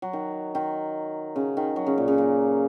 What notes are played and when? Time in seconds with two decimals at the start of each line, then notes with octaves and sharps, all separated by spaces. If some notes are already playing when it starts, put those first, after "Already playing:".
0.02 F#3
0.13 D#3
0.55 D#3
1.36 C#3
1.57 D#3
1.76 F#3
1.87 C#3
1.98 A#2
2.08 C#3
2.18 A#3